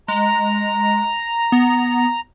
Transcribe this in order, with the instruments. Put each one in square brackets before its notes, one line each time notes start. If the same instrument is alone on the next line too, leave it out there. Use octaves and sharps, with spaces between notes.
[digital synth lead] G#3 [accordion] A#5
[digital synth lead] B3